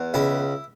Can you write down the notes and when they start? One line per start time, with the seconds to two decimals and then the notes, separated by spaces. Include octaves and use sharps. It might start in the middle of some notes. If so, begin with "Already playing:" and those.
Already playing: E2
0.14 C#2 E4